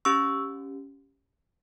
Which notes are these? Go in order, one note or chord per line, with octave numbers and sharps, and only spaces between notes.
C#4 G4 C#6 E6